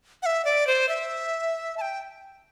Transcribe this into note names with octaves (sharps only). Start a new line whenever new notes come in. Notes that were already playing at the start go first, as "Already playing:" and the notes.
F#5
E5
D5
C5
E5
A5
G5